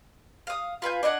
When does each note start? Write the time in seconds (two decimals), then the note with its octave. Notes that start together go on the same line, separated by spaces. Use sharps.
0.47 F5 D#6
0.82 F4 B4 G#5 G6
1.03 D4 D#5 F#5 G#5